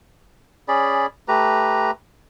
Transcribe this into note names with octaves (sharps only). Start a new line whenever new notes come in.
C#4 G#4 D5 B5
A3 G4 B4 A#5